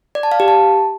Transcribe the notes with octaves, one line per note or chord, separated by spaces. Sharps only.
D5
A5
F5
G4
A5